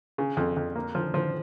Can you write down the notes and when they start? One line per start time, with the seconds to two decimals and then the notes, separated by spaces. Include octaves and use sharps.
0.18 C#3
0.37 F2
0.56 F2
0.76 A#3
0.95 F3
1.14 F3